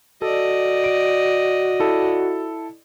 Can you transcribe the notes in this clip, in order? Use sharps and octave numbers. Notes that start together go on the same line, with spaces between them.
F#4 A4 D5 D#5
D7
E4 A4